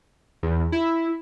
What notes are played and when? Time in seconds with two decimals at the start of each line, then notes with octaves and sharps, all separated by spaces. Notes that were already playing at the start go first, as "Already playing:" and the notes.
0.43 E2
0.72 E4